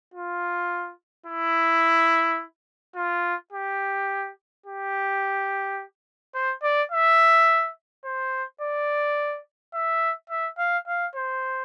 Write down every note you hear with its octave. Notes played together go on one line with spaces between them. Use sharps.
F4
E4
F4
G4
G4
C5
D5
E5
C5
D5
E5
E5
F5
F5
C5